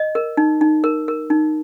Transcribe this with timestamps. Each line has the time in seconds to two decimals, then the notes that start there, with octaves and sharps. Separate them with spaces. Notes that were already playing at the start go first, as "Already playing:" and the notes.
Already playing: D#5
0.15 A#4
0.37 D#4
0.61 D#4
0.84 A#4
1.08 A#4
1.30 D#4